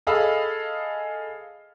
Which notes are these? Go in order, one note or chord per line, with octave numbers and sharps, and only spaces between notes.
G#4 A4 D#5 F5 B5 E6